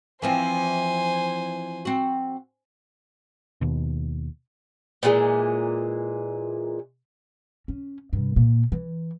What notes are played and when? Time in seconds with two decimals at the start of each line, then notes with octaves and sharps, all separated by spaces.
0.22 E3 F3 C4 C5 G#5
1.85 C4 F#4
3.61 D#2 B2
5.03 A#2 E3 F#3 G#3
7.68 C#4
8.13 G2 C3
8.36 A#2 A#3
8.72 E3